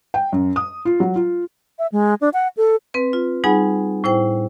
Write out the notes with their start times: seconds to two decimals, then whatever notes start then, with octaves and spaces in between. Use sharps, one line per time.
0.14 G5
0.33 F#2
0.56 D#6
0.85 F4
1.00 F#3
1.16 F4
1.79 E5
1.92 G#3
2.21 D4
2.34 F#5
2.57 A4
2.94 C4 B4
3.13 F4
3.44 G3 D#4 G#4 F#5 G#5 B5
4.04 A2 E4 C5 G5